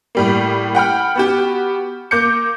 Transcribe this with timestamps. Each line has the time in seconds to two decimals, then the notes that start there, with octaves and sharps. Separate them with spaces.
0.15 A2 G3 A#3
0.75 F#5 G5 B5 F6
1.16 B3 F#4 G4
2.11 A#3 D6 G6 C#7